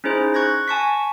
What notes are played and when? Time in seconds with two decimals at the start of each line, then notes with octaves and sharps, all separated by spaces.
0.04 C#4 D#4 E4 G#4 C5
0.34 C#6 F#6 G#6 A#6
0.68 G#5 A5 C#6 B6